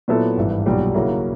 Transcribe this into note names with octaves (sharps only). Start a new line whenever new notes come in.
A#2 F#3 B3 E4 A4
G#1 G2 E3
B1 A#2 G3
C#3 F#3 A#3 C#4 E4